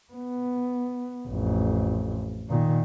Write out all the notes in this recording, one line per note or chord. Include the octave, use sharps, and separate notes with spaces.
B3
A1 F2
A#2 D#3